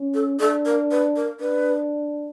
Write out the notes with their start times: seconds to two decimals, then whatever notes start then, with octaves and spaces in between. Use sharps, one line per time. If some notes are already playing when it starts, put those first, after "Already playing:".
Already playing: C#4
0.14 A4
0.39 D4 A4
0.65 A#4
0.91 B4
1.16 A#4
1.40 D4 B4